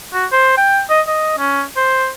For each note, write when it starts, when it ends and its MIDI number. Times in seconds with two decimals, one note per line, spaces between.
0.13 0.26 66
0.32 0.56 72
0.57 0.81 79
0.90 1.01 75
1.08 1.34 75
1.38 1.63 61
1.76 2.09 72